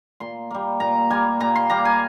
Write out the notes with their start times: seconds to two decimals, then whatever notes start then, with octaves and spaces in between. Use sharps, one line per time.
0.20 A#2 C6
0.51 G3 A#3
0.80 A#2 A#5
1.10 G3 A#3 G#5
1.40 A#2 A#5
1.55 C6
1.70 G3 A#3 A#5
1.85 G#5